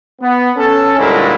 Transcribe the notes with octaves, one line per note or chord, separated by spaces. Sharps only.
B3
C#4 A4
D2 A#2 G3 G#3 A#3 E4